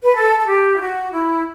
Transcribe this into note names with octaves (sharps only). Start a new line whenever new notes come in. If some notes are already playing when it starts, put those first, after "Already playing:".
B4
A4
A4
G4
E4
F#4
E4